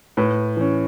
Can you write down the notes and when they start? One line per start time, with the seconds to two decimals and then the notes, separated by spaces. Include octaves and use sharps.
0.17 A2 B4
0.57 E3 C#4